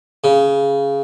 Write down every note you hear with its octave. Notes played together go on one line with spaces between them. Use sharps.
C#3